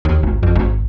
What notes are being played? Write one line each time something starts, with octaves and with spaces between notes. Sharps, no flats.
D#2
G#1
F2
G#1